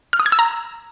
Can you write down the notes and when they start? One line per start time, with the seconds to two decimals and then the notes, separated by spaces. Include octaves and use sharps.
0.13 F6
0.20 D#6
0.26 G#6
0.32 E6
0.39 A#5